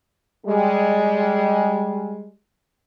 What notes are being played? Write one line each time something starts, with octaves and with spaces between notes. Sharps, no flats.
G3 G#3